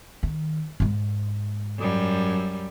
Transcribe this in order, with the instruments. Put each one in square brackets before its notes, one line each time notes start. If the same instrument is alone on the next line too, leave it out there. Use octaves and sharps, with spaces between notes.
[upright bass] D#3
G#2 G#3
[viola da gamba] F#2 G3